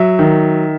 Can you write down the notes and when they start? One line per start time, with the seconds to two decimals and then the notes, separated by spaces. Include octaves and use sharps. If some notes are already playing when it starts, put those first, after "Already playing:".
Already playing: F#3 E5
0.19 D#3